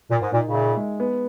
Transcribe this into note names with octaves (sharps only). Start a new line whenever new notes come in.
A#2 A#4
G#2
A#2 D#4
A#2 C#3
E5
G#3
B3